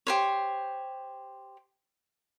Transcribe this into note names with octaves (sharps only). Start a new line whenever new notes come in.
G4 C5 C#5